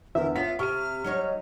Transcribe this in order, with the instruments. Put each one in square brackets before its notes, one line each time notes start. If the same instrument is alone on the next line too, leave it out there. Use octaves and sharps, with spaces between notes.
[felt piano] E2 D3 [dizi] A#4 [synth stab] E5
[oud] B3 C#4 F4 [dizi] F5 [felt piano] B6
[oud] C3 [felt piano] C#6 D#7 [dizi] F6
[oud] F#3 D#4 C#5